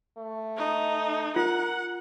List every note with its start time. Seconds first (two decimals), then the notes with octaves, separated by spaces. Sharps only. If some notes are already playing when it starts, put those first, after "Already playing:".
0.18 A3
0.57 D#4
1.36 F4 A#4 F#5